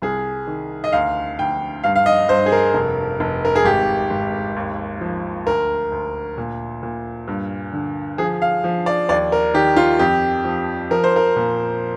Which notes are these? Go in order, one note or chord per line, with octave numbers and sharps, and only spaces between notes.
C2 G#4
D#3
D#5
D2 F5
D2 G5
G2 F5
F5
D#5
G2 C5
G#4
A#4
F1
F1
A#4
G#4
G#1 G4
G#1
D#2
F3
D2 A#4
D2
A#2
A#2
G2
D3
F3 G#4
F5
F3
D5
D#2 D5
A#4
D#3 G4
F4
F2 G4
F3
F3 A#4
C5
A#4
A#2